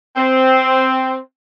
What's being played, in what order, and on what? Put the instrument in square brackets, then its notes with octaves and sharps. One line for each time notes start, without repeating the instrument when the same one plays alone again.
[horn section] C4